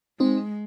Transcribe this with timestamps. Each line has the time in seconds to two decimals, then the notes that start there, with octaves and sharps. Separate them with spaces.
0.20 G#3 C4 D#4